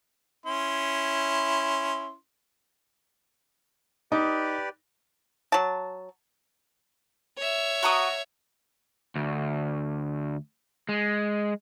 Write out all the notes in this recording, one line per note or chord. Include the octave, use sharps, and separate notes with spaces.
C#4 E4 C6
D#4 G4 B4 D5
F#3 A5
C#5 E5
F#4 A#5 D#6
D2
G#3